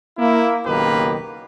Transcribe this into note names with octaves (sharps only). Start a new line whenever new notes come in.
A#3 E4
F#1 B1 D#3 A#3 G4 B4